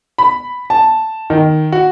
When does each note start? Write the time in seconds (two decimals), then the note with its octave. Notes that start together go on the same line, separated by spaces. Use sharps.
0.18 B5
0.70 A5
1.30 D#3
1.72 F#4